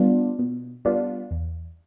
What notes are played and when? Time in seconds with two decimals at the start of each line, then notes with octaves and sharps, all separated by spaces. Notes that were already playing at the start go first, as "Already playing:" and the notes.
Already playing: G3 B3 D4 F4
0.39 B2
0.85 G3 B3 D4 F4
1.31 E2